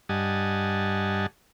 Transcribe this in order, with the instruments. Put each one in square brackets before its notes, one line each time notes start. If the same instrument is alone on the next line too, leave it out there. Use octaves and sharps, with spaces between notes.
[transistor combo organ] G2 G3 D#5 F#5 G#5 A5